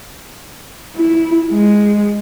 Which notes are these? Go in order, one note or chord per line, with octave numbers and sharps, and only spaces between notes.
E4
G#3